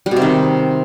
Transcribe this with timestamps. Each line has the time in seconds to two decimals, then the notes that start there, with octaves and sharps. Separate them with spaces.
0.06 G3
0.11 B2
0.16 C3
0.22 D#3